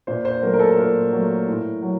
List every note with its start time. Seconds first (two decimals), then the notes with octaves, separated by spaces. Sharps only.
0.07 A#2 C5
0.25 C5
0.42 F#3 A3 A#4
0.54 A#4
0.60 A4
0.77 A#2 A#4
1.13 F#3 A3
1.48 A2
1.82 F#3